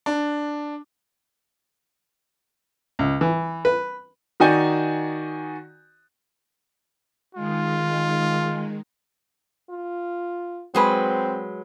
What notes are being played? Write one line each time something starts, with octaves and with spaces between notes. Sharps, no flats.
D4
C#2
E3
B4
D#3 D#4 F#4 D5 G#5 G6
D#3 G#3 F4
F4
F#3 G#3 C4 B4